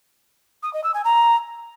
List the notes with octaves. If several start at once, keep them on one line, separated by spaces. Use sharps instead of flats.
D#6
D#5
E6
G#5
A#5